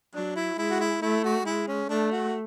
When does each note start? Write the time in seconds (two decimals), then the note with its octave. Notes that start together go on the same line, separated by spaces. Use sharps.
0.14 F#3 D4
0.36 E4
0.58 G#3 E4
0.70 F#4
0.80 E4
1.02 A3 E4
1.25 F#4
1.46 G#3 E4
1.68 C#4
1.89 A3 D4
2.12 F#4